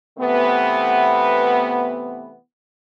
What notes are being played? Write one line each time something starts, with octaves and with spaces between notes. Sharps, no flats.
C3 E3 A3 B3